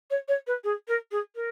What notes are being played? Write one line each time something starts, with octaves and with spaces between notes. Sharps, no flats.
C#5
C#5
B4
G#4
A#4
G#4
A#4